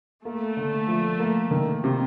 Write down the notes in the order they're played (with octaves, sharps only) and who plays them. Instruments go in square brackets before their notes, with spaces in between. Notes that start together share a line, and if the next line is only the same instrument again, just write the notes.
[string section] A3 [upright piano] A#3
[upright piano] D3
F3
A#3
D#3
C3